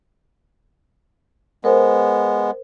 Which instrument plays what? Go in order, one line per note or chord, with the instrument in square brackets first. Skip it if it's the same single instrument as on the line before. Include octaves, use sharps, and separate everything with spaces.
[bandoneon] G#3 B3 [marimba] A#4 C5